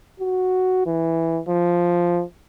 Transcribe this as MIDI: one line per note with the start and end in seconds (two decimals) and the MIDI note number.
0.20 0.81 66
0.86 1.40 52
1.48 2.22 53